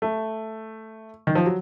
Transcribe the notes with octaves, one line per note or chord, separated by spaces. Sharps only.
A3
D#3
F3
F#3